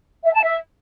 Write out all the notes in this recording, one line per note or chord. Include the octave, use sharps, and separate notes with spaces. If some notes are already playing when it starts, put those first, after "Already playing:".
E5
A5
E5